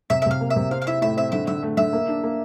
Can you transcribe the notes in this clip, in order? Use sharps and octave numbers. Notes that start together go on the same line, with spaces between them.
C3 E5
E5
C3 F5
A#3
E5
C3
C4 F5
F5
E4 E5
A2 E5
C4 E5
D3 E5
D3 E5
A3
D3 E5
A#3
D4
A#3